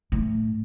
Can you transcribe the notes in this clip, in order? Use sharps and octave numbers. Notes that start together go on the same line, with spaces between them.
A2